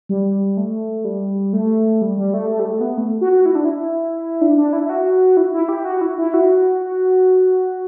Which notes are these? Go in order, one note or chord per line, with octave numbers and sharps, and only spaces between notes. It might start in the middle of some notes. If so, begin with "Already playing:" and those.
G3
A3
G3
A3
G3
G3
A3
A3
G3
A3
B3
A3
F#4
F#4
E4
D4
E4
D4
D4
E4
E4
F#4
E4
E4
G4
F#4
E4
E4
F#4
F#4